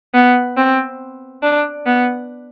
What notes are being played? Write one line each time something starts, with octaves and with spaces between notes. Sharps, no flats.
B3
C4
D4
B3